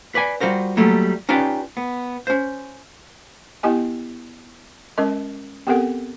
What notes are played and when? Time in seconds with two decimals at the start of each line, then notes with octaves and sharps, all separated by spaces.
0.15 B4 D5 G#5
0.41 G3 F4 F#4 A#4 C5
0.77 F#3 G3 A3 A#3
1.29 C#4 D#4 F4 G4 B4 D5
1.77 B3
2.27 C#4 C5
3.63 B3 E4 G4 D#5 G#5
4.98 G#3 C#4 A#4 D#5
5.67 B3 C4 G4 A4 A#4 F#5